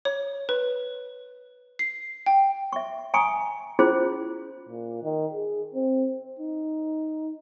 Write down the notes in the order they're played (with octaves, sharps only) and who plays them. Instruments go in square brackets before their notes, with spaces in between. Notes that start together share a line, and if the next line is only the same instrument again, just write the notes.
[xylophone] C#5
B4
C7
G5
[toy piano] E5 C#6
G5 G#5 A#5 C#6 D#6
C#4 E4 F4 G#4 C5
[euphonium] A#2
D#3
G#4
C4
D#4